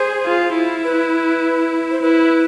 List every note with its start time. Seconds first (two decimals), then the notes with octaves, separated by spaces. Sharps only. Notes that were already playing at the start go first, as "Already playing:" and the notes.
Already playing: G#4 C5
0.25 F4
0.54 E4
0.84 B4
1.91 C5
2.02 E4 B4